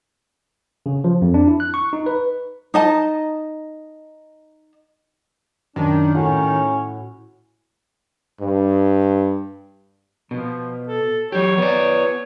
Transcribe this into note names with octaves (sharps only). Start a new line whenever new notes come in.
C#3
F3
F2
D4
E4
F#6
C#6
D#4
B4
D#4 D#5 A5
F#2 D#3 D4
A2 C#4 F#4
G2
B2 F3
A4
F#3 G4 C#5
B3 D5